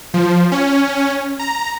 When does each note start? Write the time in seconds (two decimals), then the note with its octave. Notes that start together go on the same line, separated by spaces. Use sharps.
0.14 F3
0.52 C#4
1.39 A#5